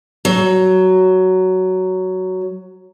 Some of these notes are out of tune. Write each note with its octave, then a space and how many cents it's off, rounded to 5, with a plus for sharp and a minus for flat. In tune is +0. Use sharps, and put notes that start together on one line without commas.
F#3 +10